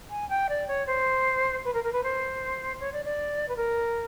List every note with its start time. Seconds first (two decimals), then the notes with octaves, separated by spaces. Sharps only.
0.10 G#5
0.29 G5
0.49 D5
0.68 C#5
0.87 C5
1.65 B4
1.73 A#4
1.84 A#4
1.92 B4
2.03 C5
2.80 C#5
2.93 D5
3.05 D5
3.48 B4
3.56 A#4